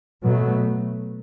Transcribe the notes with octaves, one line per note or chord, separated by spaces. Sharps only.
B2 F#3 A3